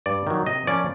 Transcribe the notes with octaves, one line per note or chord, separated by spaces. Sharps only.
G2 D5
D#3 F#3
C3 D#5
F3 A#3 C#4 D5